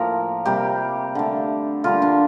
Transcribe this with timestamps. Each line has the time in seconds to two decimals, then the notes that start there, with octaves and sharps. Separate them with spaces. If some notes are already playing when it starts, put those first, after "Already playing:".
Already playing: A2 F3 A#3 A#4
0.45 C3 G3 A#3 G4
1.15 D3 A3
1.84 D3 G3 A#3 F4
2.02 D4